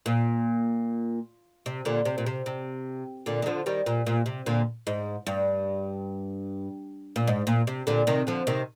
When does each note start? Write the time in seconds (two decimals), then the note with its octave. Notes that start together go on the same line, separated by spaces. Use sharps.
0.06 A#2
1.66 C3
1.85 A#2 D3
2.05 C3
2.18 A#2
2.26 C3
2.46 C3
3.26 A#2 D3
3.42 D#3
3.46 D3 F3
3.66 D#3 G3
3.86 A#2
4.07 A#2
4.26 C3
4.46 A#2 D3
4.87 G#2
5.27 G2
7.16 A#2
7.28 G#2
7.47 A#2
7.67 C3
7.87 A#2 D3
8.07 C3 D#3
8.27 D3 F3
8.47 C3 D#3